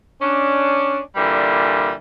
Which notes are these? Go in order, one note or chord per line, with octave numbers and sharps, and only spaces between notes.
C#4 D4
A#2 D3 E3 G3